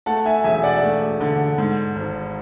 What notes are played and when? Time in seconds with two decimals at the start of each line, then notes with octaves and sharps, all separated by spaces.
0.06 A3 F#5 A5
0.26 E5 G#5
0.44 E1 E5 G#5
0.63 D5 F#5
0.83 A3
1.20 D3
1.58 G#2
1.95 G#1